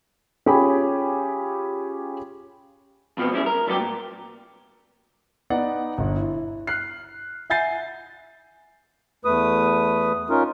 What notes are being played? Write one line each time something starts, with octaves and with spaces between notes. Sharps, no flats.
C#4 F4 G4 G#4 G#5 B5
F2 B2 F3 B3
G3 C#4 E4 F#4 G#4
A#4
G2 F#3 G3 B3 F4 G4
A#2
B3 D#4 D5 F#5
G1
E4
F6 F#6 C7
E5 F#5 G#5 G6 A6 C7
E2 A3 B4 D#6
C#4 D#4 F4 A#4